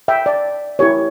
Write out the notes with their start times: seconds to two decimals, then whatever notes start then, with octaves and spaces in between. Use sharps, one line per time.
0.08 E5 G5
0.26 D5
0.79 E4 G4 A#4 C#5